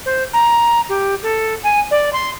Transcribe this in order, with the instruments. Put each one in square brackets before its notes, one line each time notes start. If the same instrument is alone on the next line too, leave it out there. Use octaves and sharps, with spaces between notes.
[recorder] C5
A#5
G4
A4
G#5
D5
C6